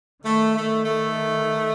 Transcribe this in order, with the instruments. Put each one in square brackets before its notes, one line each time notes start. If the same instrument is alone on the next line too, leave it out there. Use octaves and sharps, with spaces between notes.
[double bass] D#3 [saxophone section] A3
[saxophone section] A3
A3